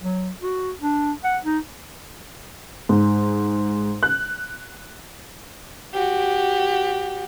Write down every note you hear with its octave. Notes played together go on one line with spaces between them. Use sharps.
F#3
F#4
D4
F#5
D#4
G#2
F#6
F#4 G4